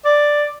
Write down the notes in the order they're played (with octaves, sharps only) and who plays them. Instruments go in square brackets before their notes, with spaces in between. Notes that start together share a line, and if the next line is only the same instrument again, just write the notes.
[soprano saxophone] D5